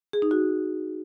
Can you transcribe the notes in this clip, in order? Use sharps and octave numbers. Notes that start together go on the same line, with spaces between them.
G#4
D#4
F#4